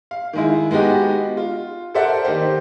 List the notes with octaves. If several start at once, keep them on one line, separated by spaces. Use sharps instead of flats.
F5
D#3 G#3 E4
G#3 B3 D#4 F#4 G4
F4
A4 A#4 C5 D5 E5 F#5
D#3 A#3 D#4 G4 C5